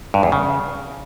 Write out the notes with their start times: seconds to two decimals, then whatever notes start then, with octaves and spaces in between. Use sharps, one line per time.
0.14 G2
0.23 E2
0.32 C#3